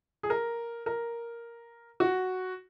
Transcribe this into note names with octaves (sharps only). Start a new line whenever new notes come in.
G#4
A#4
A#4
F#4